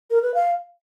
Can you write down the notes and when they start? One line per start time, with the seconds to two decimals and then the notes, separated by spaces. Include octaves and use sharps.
0.11 A#4
0.22 B4
0.34 F5